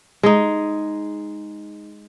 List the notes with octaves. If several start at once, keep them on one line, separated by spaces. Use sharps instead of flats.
G#3 D#4